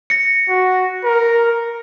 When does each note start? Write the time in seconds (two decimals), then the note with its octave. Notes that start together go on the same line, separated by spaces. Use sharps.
0.10 A#6 C#7
0.49 F#4
1.04 A#4